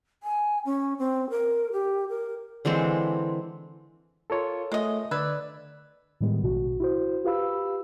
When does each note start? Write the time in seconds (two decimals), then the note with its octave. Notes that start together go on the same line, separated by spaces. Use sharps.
0.23 G#5
0.65 C#4
0.99 C4
1.30 A#4
1.72 G4
2.09 A#4
2.65 D3 E3 G#3 C4
4.30 F4 A4 A#4 C#5
4.72 G#3 A3 D#5
5.11 D3 B4 D5 E6 G#6
6.21 A2 D#3 G3 G#3 B3
6.42 A#1 B2 F#4
6.80 E4 F#4 C5
7.24 F4 G4 B4 F5 B5 E6